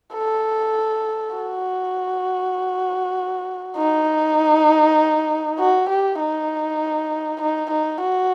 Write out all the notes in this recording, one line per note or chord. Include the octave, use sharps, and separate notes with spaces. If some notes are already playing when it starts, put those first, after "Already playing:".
A4
F#4
D#4
F#4
G4
D#4
D#4
D#4
F#4